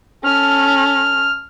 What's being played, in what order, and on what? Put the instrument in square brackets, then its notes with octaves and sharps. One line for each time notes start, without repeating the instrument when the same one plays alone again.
[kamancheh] C#4 A4 [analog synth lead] F6